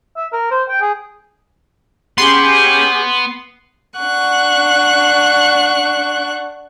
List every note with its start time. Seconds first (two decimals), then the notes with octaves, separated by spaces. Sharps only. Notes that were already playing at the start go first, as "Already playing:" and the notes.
0.17 E5
0.33 A#4
0.51 C5
0.69 G5
0.81 G#4
2.18 B3 C#4 G4 G#4 C6
3.99 D4 F#5 C#6 F#6